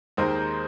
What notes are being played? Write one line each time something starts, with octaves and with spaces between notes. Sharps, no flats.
D#2 D#3 G#3 D#4 A#4 C5